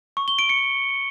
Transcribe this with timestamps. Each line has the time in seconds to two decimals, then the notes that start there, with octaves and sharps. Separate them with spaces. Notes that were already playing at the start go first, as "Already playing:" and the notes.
0.17 C#6
0.28 G7
0.39 D7
0.49 C#7